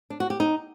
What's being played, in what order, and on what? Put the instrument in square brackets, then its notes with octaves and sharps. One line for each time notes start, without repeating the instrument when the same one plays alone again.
[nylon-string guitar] D4
F#4
G4
D#4